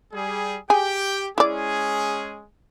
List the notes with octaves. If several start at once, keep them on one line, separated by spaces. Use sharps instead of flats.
G3 G#4
G4 G#4 G5
G#3 C#4 E4 G#4 D5